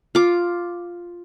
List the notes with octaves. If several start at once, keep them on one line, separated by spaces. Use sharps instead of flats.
F4 D6